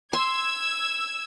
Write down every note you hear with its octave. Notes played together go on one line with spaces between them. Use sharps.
C6 E6 G#6